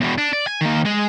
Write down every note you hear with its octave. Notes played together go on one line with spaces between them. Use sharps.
E2 B2
D4
D5
G#5
D#3 A#3
G#3 G#4